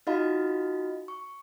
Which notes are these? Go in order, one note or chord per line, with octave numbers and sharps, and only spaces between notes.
D#4 F4 F#4 D#5 F5 B5
C#6